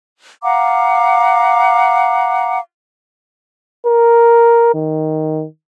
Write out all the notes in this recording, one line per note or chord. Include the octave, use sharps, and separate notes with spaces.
F5 F#5 A#5 D6
A#4
D#3